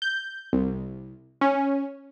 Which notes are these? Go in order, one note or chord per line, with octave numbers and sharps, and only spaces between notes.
G6
C2
C#4